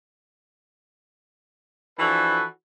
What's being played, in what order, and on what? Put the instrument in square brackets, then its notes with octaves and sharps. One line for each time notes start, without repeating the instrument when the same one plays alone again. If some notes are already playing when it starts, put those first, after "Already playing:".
[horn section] E3 F3 D4 F#4 A4 B4